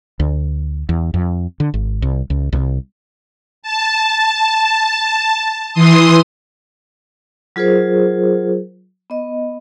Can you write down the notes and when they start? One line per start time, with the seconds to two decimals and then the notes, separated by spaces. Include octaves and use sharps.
0.20 D2
0.89 E2
1.14 F2
1.60 D3
1.74 G#1
2.02 C2
2.30 C#2
2.53 C2
3.63 A5
5.74 E3 C6 D#6
7.56 F#3 F4 G#4 A#4 C5
9.10 B3 D#5